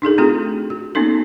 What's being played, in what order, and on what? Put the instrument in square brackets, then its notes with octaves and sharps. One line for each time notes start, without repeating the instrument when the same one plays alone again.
[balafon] D4 D#4 G#4 A4
A3 C4 F4 F#4 G#4
F#4
A#3 B3 C#4 D#4 A4